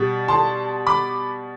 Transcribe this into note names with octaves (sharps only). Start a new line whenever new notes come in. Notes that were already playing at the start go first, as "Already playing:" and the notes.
Already playing: B2 G3
A5 C6
B5 D6